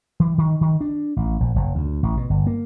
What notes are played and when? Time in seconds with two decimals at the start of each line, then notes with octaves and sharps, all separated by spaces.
0.20 E3
0.38 D#3
0.61 D#3
0.81 D4
1.17 A1
1.40 A#1
1.56 F#1
1.75 D2
2.03 A1
2.17 B2
2.30 G1
2.47 A#3